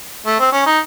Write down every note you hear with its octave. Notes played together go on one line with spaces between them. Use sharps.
A3
C4
C#4
D#4